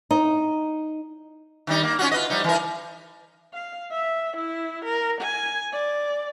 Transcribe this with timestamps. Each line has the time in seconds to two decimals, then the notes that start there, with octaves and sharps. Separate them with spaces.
0.11 D#4
1.67 D#3 G3 D#4
1.83 A#3
1.99 C#4 F4 F#4
2.11 F4 B4 D#5
2.30 F3 G3 D#4
2.44 E3 A#4
3.53 F5
3.91 E5
4.36 E4
4.84 A#4
5.20 G#5
5.72 D5